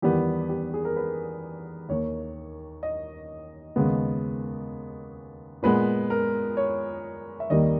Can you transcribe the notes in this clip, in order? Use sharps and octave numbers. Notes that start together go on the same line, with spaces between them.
E2 D#3 G3 B3 G4
G4
G#4
A#4
B4
D#2 D#3 A#3 C#5
D#5
D#2 C#3 G#3 B3
A#2 G#3 B3 B4
A#4
C#5
E5
D#2 D#3 G3 A#3 D#5